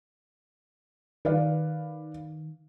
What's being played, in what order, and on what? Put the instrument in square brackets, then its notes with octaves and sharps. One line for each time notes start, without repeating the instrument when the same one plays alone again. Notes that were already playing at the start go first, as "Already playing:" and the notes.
[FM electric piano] D#3 [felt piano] B4 D5 F5